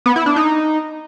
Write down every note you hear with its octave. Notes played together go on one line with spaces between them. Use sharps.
B3
E4
D4
D#4